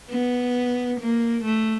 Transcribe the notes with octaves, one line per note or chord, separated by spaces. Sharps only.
B3
A#3
A3